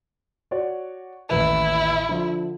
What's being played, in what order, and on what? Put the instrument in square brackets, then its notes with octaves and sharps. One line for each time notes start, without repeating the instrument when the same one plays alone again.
[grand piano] F#4 C#5 D5
[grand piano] A1 D#2 B4 [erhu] E4
[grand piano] D3 F3 F4